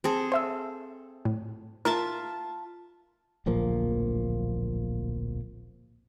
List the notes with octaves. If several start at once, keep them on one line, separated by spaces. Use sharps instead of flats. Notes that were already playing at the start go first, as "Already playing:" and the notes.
C4 G#4 A4
C5 E5 E6
A2
F4 A#4 E5 A5
D1 A#1 F3 A#3